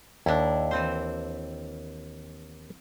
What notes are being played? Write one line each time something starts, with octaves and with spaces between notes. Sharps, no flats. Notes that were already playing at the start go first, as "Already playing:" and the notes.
D#2 D4 E4
E3 C4 C5